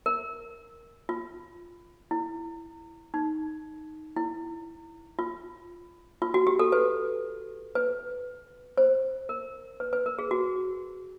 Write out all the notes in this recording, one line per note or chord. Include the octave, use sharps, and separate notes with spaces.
A#4
F4
E4
D#4
E4
F4
F4
F#4
G4
A4
B4
B4
C5
A#4
B4
B4
A#4
G#4
F#4